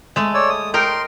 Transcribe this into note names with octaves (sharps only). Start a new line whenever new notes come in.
G#3 A3
C#5 D5 E6
D#6
D#4 A#4 G5 C6